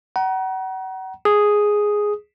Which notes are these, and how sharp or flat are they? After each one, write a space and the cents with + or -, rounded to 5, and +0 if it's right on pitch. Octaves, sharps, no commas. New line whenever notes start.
F#5 +35 A#5 +30
G#4 +0 D#6 +0